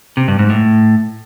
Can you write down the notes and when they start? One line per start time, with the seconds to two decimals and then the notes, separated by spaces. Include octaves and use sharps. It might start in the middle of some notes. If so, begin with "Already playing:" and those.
0.17 C3
0.28 G2
0.39 G#2
0.50 A2